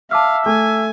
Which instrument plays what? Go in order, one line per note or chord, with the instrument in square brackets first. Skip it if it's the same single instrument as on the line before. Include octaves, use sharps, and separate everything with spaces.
[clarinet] E5 [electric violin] F5 [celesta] A5 D6 F6
[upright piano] A3 [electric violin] G#5